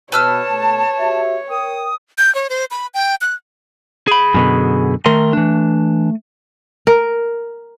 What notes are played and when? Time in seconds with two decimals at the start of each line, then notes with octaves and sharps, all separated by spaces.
0.12 B2 B4 C#5 A5 E6 F6
0.49 B2 A3
0.99 F#4 G4 E5
1.49 A#4 G5 D#6
2.18 G6
2.35 C#5
2.50 C5
2.71 B5
2.94 G5
3.21 F#6
4.08 G#4 B5
4.34 F#2 B2 D3
5.06 D#3 A3 A#4 C6
5.33 E3 D4
6.87 A#4